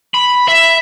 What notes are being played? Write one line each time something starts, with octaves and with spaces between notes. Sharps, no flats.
B5
E5